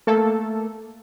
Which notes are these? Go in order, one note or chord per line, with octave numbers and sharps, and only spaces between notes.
A3 A#3 A4